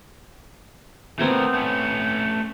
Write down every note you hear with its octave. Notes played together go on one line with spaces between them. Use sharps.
A3 B3 C4 A#4 C#5
A3 C#4